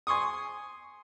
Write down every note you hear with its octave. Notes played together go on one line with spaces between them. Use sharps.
G#5 C6 C#6 D#6